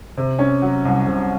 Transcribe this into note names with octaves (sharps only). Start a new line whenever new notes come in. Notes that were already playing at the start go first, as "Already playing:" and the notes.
C3
C#4
F#3
C2
C3